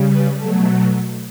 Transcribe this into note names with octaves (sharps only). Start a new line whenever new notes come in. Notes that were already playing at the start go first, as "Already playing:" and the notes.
Already playing: C#3 G3
B4
B2 F#3 A3 A4